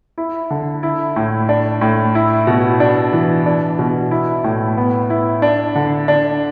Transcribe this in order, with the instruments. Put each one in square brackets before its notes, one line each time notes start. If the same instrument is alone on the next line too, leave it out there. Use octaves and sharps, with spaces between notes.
[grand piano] E4
D3
E4
A2
D4
A2
E4
B2
D4
E3
D4
B2
E4
A2
B3
E4
D4
D3
D4